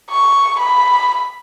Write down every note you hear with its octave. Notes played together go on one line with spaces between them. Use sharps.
C#6
B5